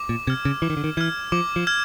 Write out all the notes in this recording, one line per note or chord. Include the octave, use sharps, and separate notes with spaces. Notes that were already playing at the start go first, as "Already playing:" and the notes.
Already playing: D6
A#2
C3 F6 G#6
C#3
E3 D6
D#3
D3
D#3
E3 F6 G#6
F3 D6
F3
F6 G#6